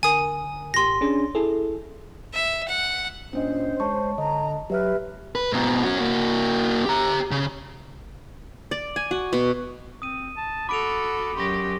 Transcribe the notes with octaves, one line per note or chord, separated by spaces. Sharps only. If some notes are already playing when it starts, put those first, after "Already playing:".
D3 A#4 G#5 D#6
A1 G4 C6 A#6
C#4 D4 G#4
E4 G#4 A4
E5
F#5
A#2 C#4 D4 C5 D#5
G#3 C#5 A5 C#6
D3 D#5 A5 A#5
F#3 G4 B4 E5 F6
B4
G#2 B2
C#4 F#4
A#3 F#4
G4 A#5
C#3
D5
G#5
F#4
B2
C4 D#6 D#7
A5
F#4 A4 B5 D6 D7 F7
F#2 G4 C6 C#6 A#6